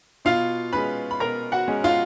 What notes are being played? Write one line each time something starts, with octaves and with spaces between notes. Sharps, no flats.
B2 F4 F5
G#3 C#4 B4 B5
B5
B2 A#4 A#5
F#4 F#5
G#3 C#4
F4 F5